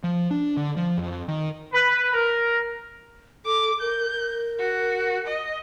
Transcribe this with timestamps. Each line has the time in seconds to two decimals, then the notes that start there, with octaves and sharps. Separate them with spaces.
0.04 F3
0.31 D4
0.57 D3
0.77 F3
0.97 F2
1.28 D#3
1.73 B4
2.14 A#4
3.45 A4 D6
3.81 A#4 G6
4.12 A#4
4.59 F#4
5.27 D#5